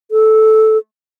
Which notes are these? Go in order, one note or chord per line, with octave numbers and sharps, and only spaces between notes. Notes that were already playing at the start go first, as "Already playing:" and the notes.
A4